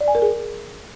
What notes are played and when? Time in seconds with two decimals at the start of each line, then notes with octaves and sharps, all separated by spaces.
0.01 D5
0.08 G#5
0.15 A#4
0.22 G#4